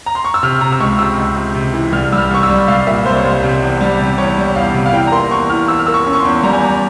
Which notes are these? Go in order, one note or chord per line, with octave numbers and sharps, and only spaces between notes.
A#5
C6
C#6
E6
C3 F6
C3 A#5
E6
C#2 C#6
C3 E6
C#2
C3
C3
E3
C2 F6
G3 E6
F6
C2 C#6
E6
G3
C2 F5
A#2 E5
C2 C5
C#5
C2 C5
C3
E2
G3
C3
E2 C#5
G3
E2 F5
C3
F5
E3 G5
A#5
A#3 C6
E2 C#6
E3 F6
E3 E6
F6
A#3 E6
C#6
C#4
C#6
C6
E2
G3 A#5
G#5
G3 A#5